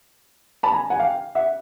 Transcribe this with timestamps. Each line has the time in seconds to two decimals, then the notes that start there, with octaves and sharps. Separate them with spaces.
0.63 A5 B5
0.72 G#5 A#5
0.90 F#5 G#5
0.99 F5 G5
1.35 E5 F#5